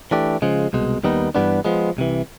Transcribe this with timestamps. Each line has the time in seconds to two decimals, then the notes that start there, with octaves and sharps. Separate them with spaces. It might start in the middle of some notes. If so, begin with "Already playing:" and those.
0.11 E3 A3 D4 G4
0.42 C#3 F3 G#3
0.73 C2 B2 G#3
1.04 D#2 D#3 G3 B3 D#4
1.35 G2 E3 G3 B3 D4
1.65 F3 G#3 B3
1.97 C2 C3 E3